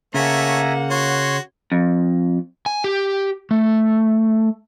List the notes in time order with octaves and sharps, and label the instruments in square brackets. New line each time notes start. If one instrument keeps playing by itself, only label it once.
[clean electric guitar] C#3 [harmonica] A3 C#5 [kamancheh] A#3 F#5 [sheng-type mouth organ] E5 G#5 A#5
[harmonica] F#4 [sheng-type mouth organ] C#5 C6
[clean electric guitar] F2
[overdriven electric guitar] G#5
G4
A3